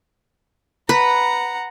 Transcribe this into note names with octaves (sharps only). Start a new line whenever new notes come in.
B4 F#5 A#5